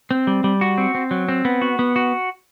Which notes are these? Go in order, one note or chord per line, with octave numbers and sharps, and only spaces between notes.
C4
G3
G3
F#4
C4
C4
F#3
C4
B3
F#4
B3
F#4